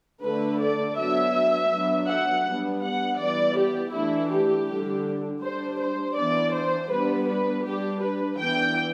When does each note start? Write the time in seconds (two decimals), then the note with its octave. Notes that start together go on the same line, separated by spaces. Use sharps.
0.23 D3 A3 D4 B4
0.60 D5
0.98 F#3 B3 D4 E5
1.72 F#3 B3 D4
2.08 F#5
2.46 G3 B3 D4
2.83 F#5
3.20 E3 G3 B3 D5
3.58 G4
3.94 E3 A3 D4 E4
4.31 G4
4.68 D3 G3 D4
5.43 G3 D4 C5
5.80 C5
6.17 E3 B3 D4 D5
6.54 C5
6.91 G3 B3 D4 B4
7.28 B4
7.65 G3 D4 G4
8.02 B4
8.39 E3 B3 D4 G5